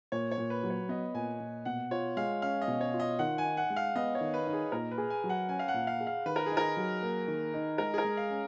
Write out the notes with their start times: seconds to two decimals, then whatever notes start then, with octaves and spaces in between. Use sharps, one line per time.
0.12 A#2 C#5
0.31 C#5
0.38 A#2
0.50 B4
0.63 F#3
0.70 C#5
0.89 B3 D#5
1.14 A#2 G#5
1.40 A#2
1.65 B2 F#5
1.91 F4 C#5
2.17 G#3 F5
2.42 C#4 F5
2.62 D#5
2.68 B2
2.81 C#5
2.94 F4
3.00 D#5
3.19 D#3 F#5
3.38 G#5
3.45 D#4
3.57 F#5
3.70 G#3
3.76 F5
3.95 B3 D#5
4.15 C#5
4.21 D#3
4.34 B4
4.47 D#4
4.53 G#4
4.72 A#2 A#4
4.91 B4
4.98 G#4
5.10 G#5
5.24 F#3
5.29 F#5
5.49 C#4 G#5
5.59 F5
5.68 F#5
5.74 A#2
5.87 F5
6.01 G#4
6.07 F5
6.26 D#3 B4
6.36 A#4
6.46 G#4
6.52 D#4
6.57 A#4
6.77 F#3
7.02 A#3
7.28 D#3
7.54 D#4
7.78 G#3 A#4
7.94 G#4
7.98 A#4
8.04 G#3
8.17 F5
8.30 C#4